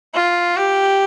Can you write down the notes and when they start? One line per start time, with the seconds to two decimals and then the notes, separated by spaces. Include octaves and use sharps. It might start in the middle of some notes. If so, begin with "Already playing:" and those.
0.15 F4
0.57 G4